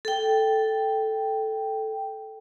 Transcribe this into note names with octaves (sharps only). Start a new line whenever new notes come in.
A4 G5